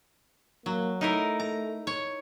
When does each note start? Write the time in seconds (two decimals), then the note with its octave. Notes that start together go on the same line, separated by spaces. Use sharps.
0.66 F#3 A#3
1.01 A3 D#4 E4 A#4
1.40 A#5
1.87 C#5